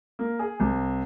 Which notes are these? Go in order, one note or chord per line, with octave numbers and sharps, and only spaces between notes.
A#3
G#4
C2